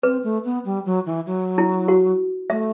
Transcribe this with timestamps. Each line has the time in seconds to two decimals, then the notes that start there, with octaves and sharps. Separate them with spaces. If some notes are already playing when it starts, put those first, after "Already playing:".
0.03 C4 B4
0.24 A3
0.45 B3
0.65 G3
0.86 F#3
1.06 E3
1.26 F#3
1.58 E4
1.88 F#4
2.50 A3 E5